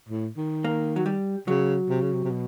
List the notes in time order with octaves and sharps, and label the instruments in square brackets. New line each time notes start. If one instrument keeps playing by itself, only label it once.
[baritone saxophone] A2
D#3
[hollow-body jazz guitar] A#3
F#3
G3
[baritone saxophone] C#3 [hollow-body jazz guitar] F#3
[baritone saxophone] C3
C#3
C3
C3
B2